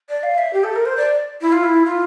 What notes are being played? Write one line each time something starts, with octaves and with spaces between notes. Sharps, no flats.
D5
F5
E5
G4
A4
A#4
C5
D5
E4
F4
E4
F4